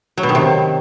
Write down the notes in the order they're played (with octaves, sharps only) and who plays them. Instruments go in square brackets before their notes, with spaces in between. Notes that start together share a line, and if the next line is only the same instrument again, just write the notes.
[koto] F#3
B2
D#3
C3